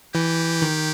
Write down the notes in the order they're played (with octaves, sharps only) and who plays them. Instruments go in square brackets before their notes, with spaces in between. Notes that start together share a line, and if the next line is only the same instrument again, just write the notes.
[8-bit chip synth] E3 [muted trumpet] G4
[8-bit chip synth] D#3